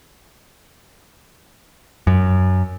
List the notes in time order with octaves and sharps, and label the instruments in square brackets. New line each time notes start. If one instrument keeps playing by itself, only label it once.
[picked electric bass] F#2